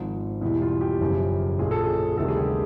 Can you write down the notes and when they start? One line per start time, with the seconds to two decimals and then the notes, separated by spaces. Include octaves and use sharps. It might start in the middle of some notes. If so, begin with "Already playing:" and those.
Already playing: G#1 G#2 F3
0.41 E2 B2 G3 E4
0.61 F4
0.81 G4
1.00 F#1 F#2 C#3 F3
1.59 A#1 A#2 F3 G#4
1.71 A4
1.84 G#4
2.17 D2 C3 D#3 G3 A4
2.28 G#4
2.37 G4